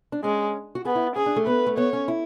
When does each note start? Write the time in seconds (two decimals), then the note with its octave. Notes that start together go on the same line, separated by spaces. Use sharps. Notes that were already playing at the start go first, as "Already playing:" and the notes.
0.12 D4
0.24 G#3 C#4
0.75 F#4
0.85 B3 G#4
0.95 E4
1.16 C#4 G#4
1.26 D4
1.36 A3
1.46 B3 B4
1.66 A3
1.77 B3 C#5
1.93 C#4
2.08 E4